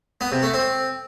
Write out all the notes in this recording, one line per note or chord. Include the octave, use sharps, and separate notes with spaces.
B3
C3
A3
C4